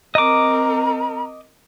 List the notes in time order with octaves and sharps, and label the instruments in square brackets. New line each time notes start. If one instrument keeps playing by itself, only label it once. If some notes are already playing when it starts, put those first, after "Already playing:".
[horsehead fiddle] C4 A#4 [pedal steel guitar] D#5 D6 [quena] A#5